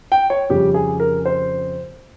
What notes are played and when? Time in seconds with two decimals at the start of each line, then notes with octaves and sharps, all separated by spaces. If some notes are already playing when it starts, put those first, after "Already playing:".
0.12 G5
0.30 C#5
0.50 F2 C#3 G3 G4
0.74 G#4
1.00 A#4
1.26 C5